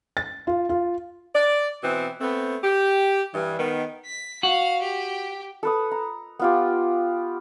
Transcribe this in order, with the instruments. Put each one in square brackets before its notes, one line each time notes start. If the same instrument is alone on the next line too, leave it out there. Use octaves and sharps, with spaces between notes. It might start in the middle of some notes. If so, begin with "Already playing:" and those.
[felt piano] A6
F4
F4
[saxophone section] D5
B2 E3 C4
A3 B3 C4
G4
G2 E3
D#3 B3
[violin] B6
[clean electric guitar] F#4 [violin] F5
[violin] G4
[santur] A4 B4 D#6
A#5
B3 F4 G4